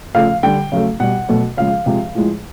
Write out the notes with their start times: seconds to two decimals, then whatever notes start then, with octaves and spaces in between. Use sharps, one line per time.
0.15 C#3 F3 A3 F5
0.43 D3 G3 G5
0.72 C#3 F#3 A3
1.00 B2 G3 F#5
1.29 B2 F#3 A3
1.57 C#3 F3 G#3 F5
1.86 C3 F3 G#3
2.15 A2 F3 G#3